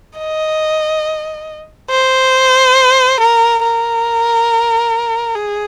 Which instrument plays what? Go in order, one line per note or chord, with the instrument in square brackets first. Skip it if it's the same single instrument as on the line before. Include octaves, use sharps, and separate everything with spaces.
[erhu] D#5
C5
A#4
A#4
G#4